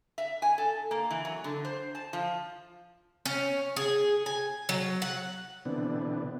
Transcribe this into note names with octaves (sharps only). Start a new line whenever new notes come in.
E5
G#5
A4
A#3
E3
F#3
D3
C5
A5
F3
C#4
G#4
G#5
F#3
F#5
B2 D3 E3 B3 C4 D4